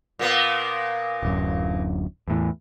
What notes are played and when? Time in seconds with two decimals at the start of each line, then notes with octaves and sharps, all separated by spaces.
0.19 A#2 A#3 B3
1.23 D1 F#2
2.28 E2 A2 E3